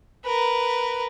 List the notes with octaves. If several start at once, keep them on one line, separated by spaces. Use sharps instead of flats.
A#4 B4